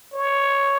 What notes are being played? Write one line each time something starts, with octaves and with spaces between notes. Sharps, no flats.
C#5